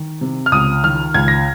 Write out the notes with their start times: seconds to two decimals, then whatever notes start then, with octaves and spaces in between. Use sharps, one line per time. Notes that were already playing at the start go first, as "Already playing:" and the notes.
Already playing: D#3
0.21 C3
0.46 F6
0.52 C#2 D#6
0.84 D#3 F6
1.14 C#2 G#6
1.28 A#6